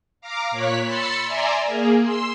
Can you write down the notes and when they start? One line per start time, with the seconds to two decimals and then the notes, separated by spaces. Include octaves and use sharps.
0.21 F5 A#5 D6
0.51 A#2 C#5 F#6 B6
0.85 B5 C6 E6 A6 C7 C#7
1.24 D5 E5 G#5 A#5 C6
1.65 A#3 G#4
2.02 C6 E6